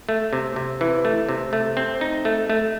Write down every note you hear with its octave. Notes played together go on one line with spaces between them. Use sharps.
A3
C3
C3
E3
A3
C3
A3
C4
D#4
A3
A3